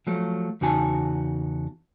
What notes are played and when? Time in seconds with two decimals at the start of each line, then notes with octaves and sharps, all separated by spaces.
0.07 F3 F#3 A3
0.61 E2 C#3 D#4 F#4 G#5 A5